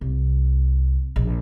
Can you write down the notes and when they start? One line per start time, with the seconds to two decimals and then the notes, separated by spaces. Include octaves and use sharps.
0.01 C2
1.16 A#1